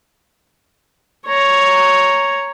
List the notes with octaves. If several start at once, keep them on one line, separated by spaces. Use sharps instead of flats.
C#5 A#5